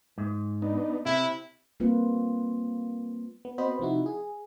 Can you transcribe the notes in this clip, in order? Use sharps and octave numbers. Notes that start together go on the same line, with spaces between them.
G#2
B3 D4 D#4
C3 C4 E4
G3 A#3 C4 F4 B4
B3
B3 C4 F#4 C5 D#5 B5
C3 F3 D#4 E4 F#4
G#4